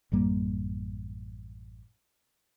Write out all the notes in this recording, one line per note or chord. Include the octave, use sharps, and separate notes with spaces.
A1 F#2 G3 A#3